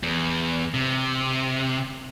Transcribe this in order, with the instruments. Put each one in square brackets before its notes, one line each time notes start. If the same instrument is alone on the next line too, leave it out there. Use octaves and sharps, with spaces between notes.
[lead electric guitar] E2
C3